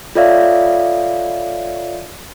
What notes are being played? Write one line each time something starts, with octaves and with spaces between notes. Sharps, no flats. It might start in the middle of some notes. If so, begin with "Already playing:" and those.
F4 A4 C#5 D5 E5 F5